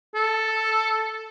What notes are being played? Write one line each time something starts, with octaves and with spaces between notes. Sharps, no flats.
A4